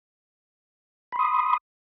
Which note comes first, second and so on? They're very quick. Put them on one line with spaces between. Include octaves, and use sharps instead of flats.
B5 C6 D#6